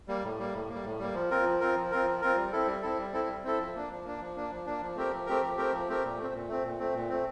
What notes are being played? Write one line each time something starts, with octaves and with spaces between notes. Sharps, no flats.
G3 A#3
A2
G3 A#3
A2
G3 A#3
A2
G3 A#3
F3
C4 F4 A#4
F3
C4 F4 A#4
F3
C4 F4 A#4
F3
C4 F4 A#4
G3
C4 E4 A4
G3
C4 E4 A4
G3
C4 E4 A4
G3
C4 E4 A4
F3
A#3 D4
F3
A#3 D4
F3
A#3 D4
F3
A#3 D4
F3
A3 C4 G4 A#4
F3
A3 C4 G4 A#4
F3
A3 C4 G4 A#4
F3
A3 C4 G4 A#4
A#2
A3 C4
A#2
A3 C4
A#2
A3 C4
A#2
A3 C4